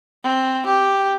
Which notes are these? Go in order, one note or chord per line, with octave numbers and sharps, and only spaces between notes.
C4
G4